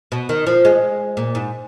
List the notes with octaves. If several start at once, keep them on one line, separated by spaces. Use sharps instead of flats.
B2
D#3
F3
G#3
A#2
G#2